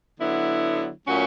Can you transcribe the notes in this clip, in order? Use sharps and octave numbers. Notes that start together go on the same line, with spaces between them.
D3 F#3 B3 E4
A#2 F#3 A3 C#4 F#4